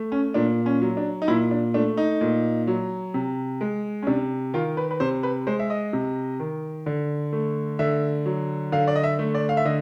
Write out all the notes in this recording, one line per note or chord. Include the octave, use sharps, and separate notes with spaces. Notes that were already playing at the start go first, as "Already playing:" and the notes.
Already playing: A3
C#4
A#2 D4
C#4
F#3
D4
D#4
A#2 E4
D4
A3 D4
D#4
A#2
F#3
C3
G#3
C#4
C3 D4
D#3 F4
B4
B4
C3 C5
B4
G#3 C5
E5
D#5
C3
D#3
D3
A3
D3 E5
F#3
D3 F5
D5
D#5
E5
A3
D5
F5
E5
D3 D#5